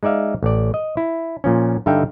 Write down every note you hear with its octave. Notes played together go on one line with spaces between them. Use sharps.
G#3 D#4 D5 E5 F5
A1 D5
D#5
E4
A#2 F3 C#4
G2 D3 D#4 E5 F5 G5